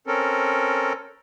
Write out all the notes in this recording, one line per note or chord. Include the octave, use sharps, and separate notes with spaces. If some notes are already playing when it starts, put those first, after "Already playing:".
C4 C#4 A4 A#4